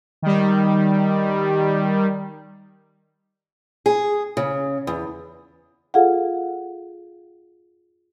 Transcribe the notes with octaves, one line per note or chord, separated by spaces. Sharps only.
D#3 G3
G#4
C#3
E2
F4 G#4 A4 F5 F#5